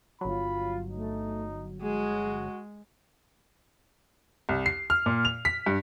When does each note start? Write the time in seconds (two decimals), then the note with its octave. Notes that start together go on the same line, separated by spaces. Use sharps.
0.21 G1 F#3 F4 B5
0.91 A3 D#4
1.82 G#3 F#4 G#4
4.49 C2
4.66 C7
4.90 F6
5.06 A#2
5.25 F7
5.45 B6
5.66 G2